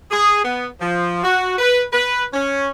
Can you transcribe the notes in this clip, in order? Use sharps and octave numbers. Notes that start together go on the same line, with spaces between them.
G#4
B3
F3
F#4
B4
B4
C#4